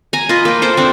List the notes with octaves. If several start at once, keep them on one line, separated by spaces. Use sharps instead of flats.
G#5 A#5
F4 B4 D#5
A#3 G5
A4 C5 D6
C4 D4